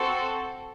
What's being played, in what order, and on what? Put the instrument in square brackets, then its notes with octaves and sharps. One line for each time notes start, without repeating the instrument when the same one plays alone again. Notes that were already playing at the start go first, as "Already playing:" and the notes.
Already playing: [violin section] C4 F#4 A4